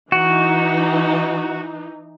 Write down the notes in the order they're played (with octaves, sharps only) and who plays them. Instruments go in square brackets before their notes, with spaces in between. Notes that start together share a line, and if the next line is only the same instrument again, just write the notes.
[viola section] E3 D#4 [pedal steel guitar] F#4